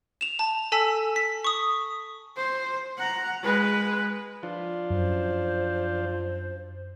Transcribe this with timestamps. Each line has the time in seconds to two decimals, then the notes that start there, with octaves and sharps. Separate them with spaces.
0.21 E7 F7
0.39 A5
0.72 A4 G#5 A5 E6 B6
1.16 B6
1.44 C#6 D#6
2.36 C5
2.98 F#5 A#5
3.43 G#3 B4
4.43 F3 D4 F4
4.90 F#2 C5